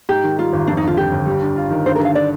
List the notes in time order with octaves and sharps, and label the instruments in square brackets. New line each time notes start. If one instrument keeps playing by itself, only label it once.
[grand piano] G#2 [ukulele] G4
[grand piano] D#3
[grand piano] G3 [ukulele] F4
[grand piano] G#1
[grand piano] F2 [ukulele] D4
[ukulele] D#4
[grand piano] D3 [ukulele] F4
[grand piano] G3 [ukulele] G4
[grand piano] G1
G3
D4
F4
D#3
[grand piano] G2 [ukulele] C5
[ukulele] A#4
[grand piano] D3
[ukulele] F5
D5